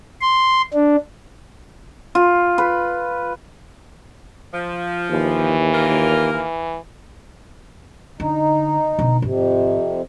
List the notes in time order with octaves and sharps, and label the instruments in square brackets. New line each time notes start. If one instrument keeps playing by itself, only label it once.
[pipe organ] C6
D4
[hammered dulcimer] F4
B4
[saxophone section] F3
[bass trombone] D#2 [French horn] E3
[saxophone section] A#3 F4 A#4
[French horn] E3
[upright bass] D3 [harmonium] D#4
[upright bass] B2 D3
[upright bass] G#1 [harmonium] F2 C3